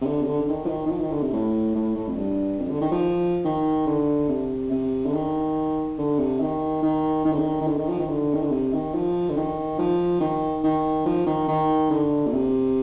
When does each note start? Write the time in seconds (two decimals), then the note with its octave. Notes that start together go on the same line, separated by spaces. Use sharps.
0.01 C3
0.06 D3
0.22 C3
0.27 D3
0.41 D3
0.48 D#3
0.65 F3
0.69 D#3
0.86 D#3
0.91 F3
1.01 D#3
1.11 D3
1.23 C3
1.33 A2
1.75 A2
1.96 A2
2.08 F2
2.17 G2
2.59 F2
2.70 D3
2.81 D#3
2.91 F3
3.44 D#3
3.87 D3
4.29 C3
4.71 C3
5.06 D3
5.14 D#3
5.98 D3
6.19 C3
6.40 D#3
6.82 D#3
7.25 D#3
7.32 D3
7.39 D#3
7.61 D#3
7.67 D3
7.78 D#3
7.89 F3
7.99 D#3
8.09 D3
8.34 D#3
8.43 D3
8.52 C3
8.73 D#3
8.94 F3
9.29 D3
9.36 D#3
9.79 F3
10.20 D#3
10.63 D#3
11.06 F3
11.26 D#3
11.48 D#3
11.90 D3
12.26 A#2
12.33 C3